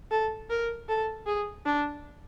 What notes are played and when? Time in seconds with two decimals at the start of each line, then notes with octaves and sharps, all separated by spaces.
0.11 A4
0.50 A#4
0.89 A4
1.26 G#4
1.66 D4